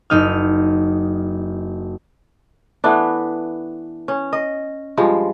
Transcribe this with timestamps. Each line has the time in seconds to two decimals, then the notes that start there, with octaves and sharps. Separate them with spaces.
0.10 F#1 D#4 F6
2.84 E3 A3 B3 D4
4.08 C#4
4.33 D#5
4.97 G2 F3 G#3